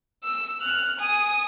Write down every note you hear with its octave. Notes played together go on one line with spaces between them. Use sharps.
E6
F6 F#6
G#5 D#6